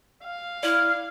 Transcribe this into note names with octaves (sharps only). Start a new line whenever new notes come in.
F5
E4 D5 F6